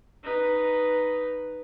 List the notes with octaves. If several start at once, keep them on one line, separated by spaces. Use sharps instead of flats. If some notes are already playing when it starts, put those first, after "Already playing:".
D#4 B4